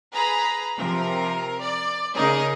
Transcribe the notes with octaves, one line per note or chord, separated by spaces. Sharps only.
G#4 B4 A#5 B5
C3 F3 A#4
D5
C#3 D#4 G#4 A#4 D#5